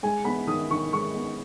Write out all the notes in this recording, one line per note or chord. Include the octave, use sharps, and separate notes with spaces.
G#3 G#5
B3 B5
D#3 D#6
D#3 C#6
G#3 C#6
B3